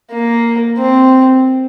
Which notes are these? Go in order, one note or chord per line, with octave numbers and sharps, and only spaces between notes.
A#3
C4